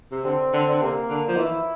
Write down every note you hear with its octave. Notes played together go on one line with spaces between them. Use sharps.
C3
D3 C4
D3
D3
C3 A#3
D3
F3
E3 E4